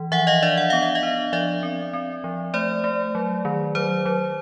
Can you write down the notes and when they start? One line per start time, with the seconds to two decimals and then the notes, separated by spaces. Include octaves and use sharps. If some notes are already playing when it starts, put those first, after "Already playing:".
Already playing: E3
0.12 F3 E5 F#5
0.27 D#5 F5
0.43 D4 D5 E5
0.57 F#5
0.70 B3 F5
0.82 E5
0.95 D#5 F5
1.03 D4
1.33 F3 D5 E5
1.63 C4
1.93 C4
2.24 F3
2.54 A3 C5 D5
2.84 A3
3.15 F#3
3.45 D#3
3.75 F#3 C5
4.06 F#3